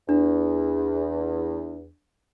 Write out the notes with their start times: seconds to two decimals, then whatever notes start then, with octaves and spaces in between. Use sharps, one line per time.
0.09 E2 D4